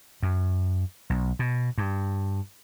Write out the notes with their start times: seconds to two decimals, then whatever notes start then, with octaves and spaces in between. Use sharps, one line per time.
0.23 F#2
1.10 B1
1.39 B2
1.78 G2